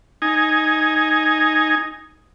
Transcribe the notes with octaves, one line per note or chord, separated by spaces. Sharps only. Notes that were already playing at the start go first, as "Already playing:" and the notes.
D#4 G#5